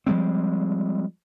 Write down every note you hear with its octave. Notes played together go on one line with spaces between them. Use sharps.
F3 G3 G#3 C4